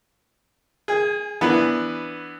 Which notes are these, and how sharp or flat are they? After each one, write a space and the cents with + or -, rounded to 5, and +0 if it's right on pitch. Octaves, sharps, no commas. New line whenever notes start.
G#4 +0 G#5 -40
E3 +0 B3 -5 D4 +0